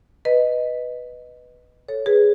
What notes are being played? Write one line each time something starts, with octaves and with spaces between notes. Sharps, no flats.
B4 D#5
A4 C#5
G#4 B4